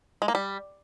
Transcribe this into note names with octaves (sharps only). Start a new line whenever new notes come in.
G#3
A#3
G3